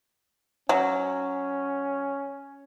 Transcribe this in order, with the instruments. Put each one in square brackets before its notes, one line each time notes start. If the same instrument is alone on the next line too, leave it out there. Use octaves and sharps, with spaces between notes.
[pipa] F#3 [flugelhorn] C#4